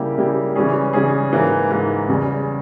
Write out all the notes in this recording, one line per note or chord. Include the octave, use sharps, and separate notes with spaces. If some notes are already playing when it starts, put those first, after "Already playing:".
Already playing: C#3 G3 A#3 E4 G4
C#3 G3 A#3 E4 G4
C#3 E3 G3 C#4 G#4
C#3 E3 G3 C#4 G#4
G#2 E3 A#3
G#2 E3 A#3
E2 C#3 G3